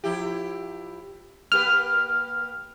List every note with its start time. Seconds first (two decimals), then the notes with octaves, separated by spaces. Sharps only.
0.04 F3 E4 G4
1.52 A#3 G4 B4 F6